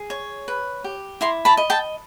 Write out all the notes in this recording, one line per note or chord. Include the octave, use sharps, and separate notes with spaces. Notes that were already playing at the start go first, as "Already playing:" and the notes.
Already playing: G#4
C#5
B4
G4
E4 A#5 C6
A5 B5
D#5
G5 A5